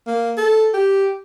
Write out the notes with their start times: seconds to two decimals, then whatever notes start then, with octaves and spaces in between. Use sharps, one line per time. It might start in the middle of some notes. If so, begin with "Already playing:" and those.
0.07 A#3
0.37 A4
0.74 G4